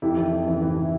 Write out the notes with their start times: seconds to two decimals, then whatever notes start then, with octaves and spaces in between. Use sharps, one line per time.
0.02 F2 E4 G4
0.17 E3
0.32 F2
0.47 E3
0.62 E3
0.76 E3